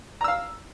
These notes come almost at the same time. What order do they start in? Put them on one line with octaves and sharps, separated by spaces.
A#5 E6 F5